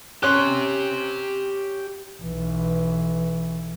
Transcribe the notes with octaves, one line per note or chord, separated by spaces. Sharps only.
C#4 G4 C6 F#6
B1 E3